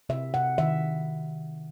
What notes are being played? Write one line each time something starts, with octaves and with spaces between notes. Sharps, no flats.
C3 E5
C3 F#5
D#3 E5